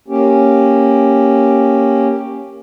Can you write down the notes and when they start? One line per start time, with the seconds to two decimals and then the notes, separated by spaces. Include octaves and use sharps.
0.08 A#3 C#4 G4